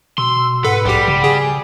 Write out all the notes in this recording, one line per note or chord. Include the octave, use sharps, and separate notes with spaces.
B2 C6 E6
G#2 A4 B4 F#5
A#1 G3 G4
C#3
G#4 G#5